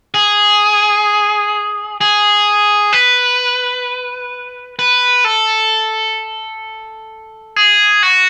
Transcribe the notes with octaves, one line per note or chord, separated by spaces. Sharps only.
G#4
G#4
B4
B4
A4
G#4
F#4